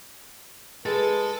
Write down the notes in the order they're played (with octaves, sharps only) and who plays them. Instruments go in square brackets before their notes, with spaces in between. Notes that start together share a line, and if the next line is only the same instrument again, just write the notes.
[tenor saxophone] G#3 [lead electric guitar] A4 A5 [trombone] B4